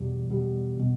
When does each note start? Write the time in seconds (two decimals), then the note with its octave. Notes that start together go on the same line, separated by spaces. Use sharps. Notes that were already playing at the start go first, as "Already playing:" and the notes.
Already playing: E2 B2 G3
0.29 E2 B2 G3
0.80 B2